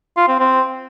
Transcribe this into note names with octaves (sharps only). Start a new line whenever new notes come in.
F4
C4
C4